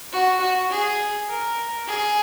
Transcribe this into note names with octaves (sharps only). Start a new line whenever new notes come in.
F#4
F#4
G#4
A#4
G#4